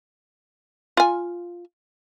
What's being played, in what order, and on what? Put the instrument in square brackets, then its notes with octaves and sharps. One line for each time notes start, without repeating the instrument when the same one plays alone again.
[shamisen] F4 G#5